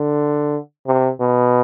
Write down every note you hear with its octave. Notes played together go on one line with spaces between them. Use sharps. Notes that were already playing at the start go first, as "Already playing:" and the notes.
Already playing: D3
C3
B2